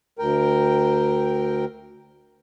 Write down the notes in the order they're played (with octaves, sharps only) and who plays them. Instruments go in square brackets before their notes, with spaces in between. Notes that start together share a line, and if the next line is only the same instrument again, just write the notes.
[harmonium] D2 A#4 G5